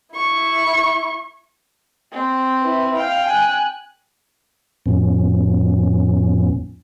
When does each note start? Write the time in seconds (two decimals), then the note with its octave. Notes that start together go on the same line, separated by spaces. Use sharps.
0.16 E4 C#6
2.12 C4
2.61 E4 B4
2.97 F5 G5
3.27 G#5 F#6
4.86 F2 A2 F3 B3 C#4